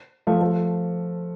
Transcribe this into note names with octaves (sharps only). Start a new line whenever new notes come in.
F3 A3
F3 A3